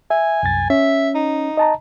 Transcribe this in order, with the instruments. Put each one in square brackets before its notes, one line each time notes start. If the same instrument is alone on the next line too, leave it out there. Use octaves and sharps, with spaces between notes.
[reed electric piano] E5 [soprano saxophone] G#5
[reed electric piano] C2 F#2 A6
[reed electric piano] C#4 [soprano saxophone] E5
[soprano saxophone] D#4
[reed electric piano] D#5 A5 A#5